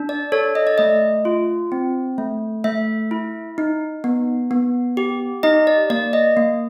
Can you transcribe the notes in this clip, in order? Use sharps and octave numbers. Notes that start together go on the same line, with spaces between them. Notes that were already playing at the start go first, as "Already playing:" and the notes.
Already playing: D4
D5
A4 C#5
D#5
D5
A3 D#5
F4
C4
A3
A3 E5
E4
D#4
B3
B3
G4
D#4 D#5
D5
A#3 D5
D#5
A#3